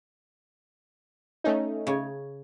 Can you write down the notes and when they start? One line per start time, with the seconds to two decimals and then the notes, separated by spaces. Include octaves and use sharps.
1.44 A3 C#4 D#4
1.87 C#3 C#5